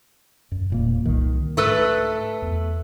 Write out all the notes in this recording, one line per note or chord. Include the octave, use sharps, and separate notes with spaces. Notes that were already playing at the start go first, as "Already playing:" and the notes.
F#2
E1 A#2 A#3
C2 D#3
G#2 A3 A4 B4
E2